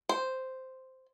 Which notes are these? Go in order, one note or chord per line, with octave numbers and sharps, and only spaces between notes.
C5